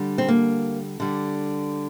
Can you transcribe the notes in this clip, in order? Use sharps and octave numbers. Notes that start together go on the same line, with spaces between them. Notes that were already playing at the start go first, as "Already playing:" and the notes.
Already playing: D3 G3
C4
A#3
D3 G3